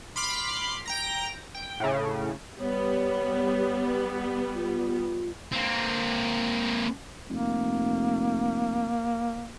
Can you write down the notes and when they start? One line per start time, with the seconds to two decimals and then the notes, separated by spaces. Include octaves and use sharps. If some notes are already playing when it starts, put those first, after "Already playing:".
0.16 B5 C6 D6 F6 C7
0.86 G5 A#5 A#6
1.55 G5
1.80 A2 C#3
2.60 G3 B3 C#5
4.55 F4
5.52 A#3 C4
7.30 F1 A#3